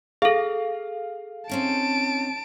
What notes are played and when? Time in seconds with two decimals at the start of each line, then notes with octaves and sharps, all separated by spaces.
0.22 G#4 A4 F5
1.49 C4 C#4 D#4 A5 D7